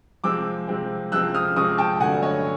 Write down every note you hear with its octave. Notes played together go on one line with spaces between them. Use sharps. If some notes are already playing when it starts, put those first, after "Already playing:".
C3 F3 G#3 C4 D6 E6
C3 F3 G#3 C4
C3 F3 G#3 C4 E6 F#6
D#6 F6
C3 F3 G#3 C4 C#6 D#6
G5 A5
G2 D3 F#3 A3 F#5 G#5
C#5 D#5